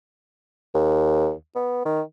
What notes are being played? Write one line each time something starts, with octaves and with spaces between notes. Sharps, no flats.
D#2
B3
D#3